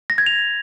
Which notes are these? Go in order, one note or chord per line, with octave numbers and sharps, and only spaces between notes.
A#6
G#6
F7